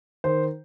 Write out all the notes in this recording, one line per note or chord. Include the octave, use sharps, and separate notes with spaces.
D#3 C5